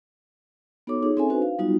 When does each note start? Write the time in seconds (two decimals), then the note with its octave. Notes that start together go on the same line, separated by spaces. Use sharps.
0.87 B3 D#4 F#4 A4 C#5 D6
1.02 D#4 F4 G#4 C#5
1.17 C4 C#4 A4 E5 G#5
1.29 D4 D#4 F#4 B4 C5
1.42 F5
1.58 F#3 G3 B3 D#4 F4 F#4